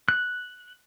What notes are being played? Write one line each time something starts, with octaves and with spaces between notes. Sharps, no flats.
F#6